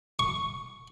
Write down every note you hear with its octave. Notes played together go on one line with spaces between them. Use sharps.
C#6